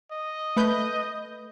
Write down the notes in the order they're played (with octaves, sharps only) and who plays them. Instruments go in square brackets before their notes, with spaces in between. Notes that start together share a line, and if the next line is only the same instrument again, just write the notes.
[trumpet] D#5
[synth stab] A3 B4 G6